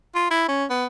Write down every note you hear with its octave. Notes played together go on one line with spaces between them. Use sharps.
F4
E4
C#4
B3